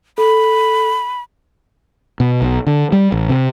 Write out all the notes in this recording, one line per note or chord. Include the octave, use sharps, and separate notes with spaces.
A4 B5
B2
B1
D3
G3
A1
C3